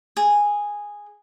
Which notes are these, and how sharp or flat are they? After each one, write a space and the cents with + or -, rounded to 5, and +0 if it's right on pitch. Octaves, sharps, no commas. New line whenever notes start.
G#4 -10